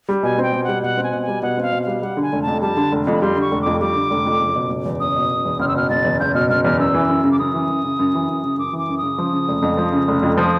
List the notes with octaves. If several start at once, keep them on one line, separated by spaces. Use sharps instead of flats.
G3
B2 G#5
C4 G5
B2
G3 F#5
B2 F#5
C4
G#5
B2
G#5
G3
B2 F#5
C4 F5
B2
G3 F5
G3 F#5
D3
G#5
F1
A5
F2
G3 A5
D3
F1
F2
B5
G3 C6
D3
C#6
F1
F2 D6
G3 D6
D3
F1
F2
F#1
B2
F#1
E2
F#1 D#6
B2
F#1
E2
F#1 F6
E6
B2 F6
F#1 A6
E2
F#1 G6
B2 F6
F#1 F6
E2 F6
F#2 E6
E3
F#2
C#3
D6
F#2 D#6
E3
F#2
C#3
F#2
E3
F#2
C#3
F#2 D6
E3
D6
F#2
C#3 D#6
F3
C#3
F1
F2
F3
C#3
F1
F2
F3 D#6